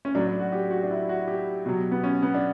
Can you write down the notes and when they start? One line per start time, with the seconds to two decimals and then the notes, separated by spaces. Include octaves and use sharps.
0.05 C#4
0.15 A2 F#3 D4
0.27 D4
0.40 F#4
0.52 G4
0.71 F#4
0.83 D4
0.90 E4
1.09 F#4
1.28 G4
1.66 B2 F#3
1.91 B3
2.04 C#4
2.23 B3
2.34 D4